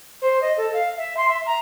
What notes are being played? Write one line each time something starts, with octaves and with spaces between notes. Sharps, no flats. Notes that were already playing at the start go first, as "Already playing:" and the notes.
C5
D#5
A4
F5
E5
C6
E5
A#5